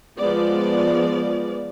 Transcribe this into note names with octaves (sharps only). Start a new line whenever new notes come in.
F3 G#3 B3 D5